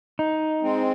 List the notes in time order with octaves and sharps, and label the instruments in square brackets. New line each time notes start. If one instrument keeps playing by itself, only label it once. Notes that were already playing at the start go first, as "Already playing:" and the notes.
[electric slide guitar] D#4
[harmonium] G#3 C4